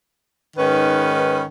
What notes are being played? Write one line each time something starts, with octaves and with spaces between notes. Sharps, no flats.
G#2 D#3 C#4 B4